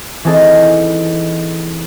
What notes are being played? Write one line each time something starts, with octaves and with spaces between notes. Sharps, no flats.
E3 C4 D#4 G#4 A4 D#5